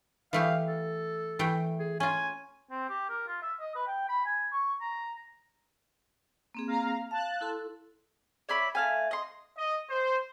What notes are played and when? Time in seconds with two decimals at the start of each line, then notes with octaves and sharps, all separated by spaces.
0.33 E3 A3 G4 F5
0.68 A4
1.39 E3 A3 G5
1.80 G#4
2.00 C#4 F4 G#5
2.71 C4
2.89 G4
3.09 A#4
3.28 F4
3.42 E5
3.60 D#5
3.75 B4
3.87 G5
4.09 B5
4.26 G#5
4.53 C#6
4.81 A#5
6.55 A#3 C4 G#4
6.68 F5 A#5
7.11 F5 A5 F#6
7.41 E4 A4 C6
8.49 C#5 D5 E5 B5
8.75 A3 F5 G#5
9.11 D#5 C6
9.58 D#5
9.90 C5